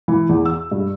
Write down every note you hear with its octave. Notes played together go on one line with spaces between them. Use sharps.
E3
E2
E6
G2